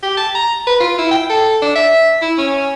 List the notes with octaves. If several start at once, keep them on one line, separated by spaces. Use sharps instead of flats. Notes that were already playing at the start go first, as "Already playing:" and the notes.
G4
A5
A#5
B4
F4
E4
G5
A4
D4
E5
E4
C#4